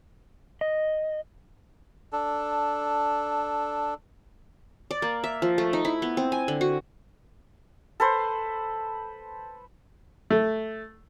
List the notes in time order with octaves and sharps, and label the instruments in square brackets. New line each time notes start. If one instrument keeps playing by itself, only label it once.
[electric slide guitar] D#5
[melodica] D4 A4
[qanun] D5
A#3
E5
F3
A3
D#4
E4
B3
C4
G#5
D3
F#4
[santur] A4 B4 C5
[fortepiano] A3